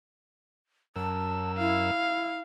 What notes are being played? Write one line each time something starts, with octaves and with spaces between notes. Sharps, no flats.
F#2 A#4 A5 E6
E4 F5